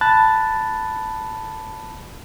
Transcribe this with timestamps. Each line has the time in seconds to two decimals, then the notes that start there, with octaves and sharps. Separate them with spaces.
0.01 A5 B5 F#6 A6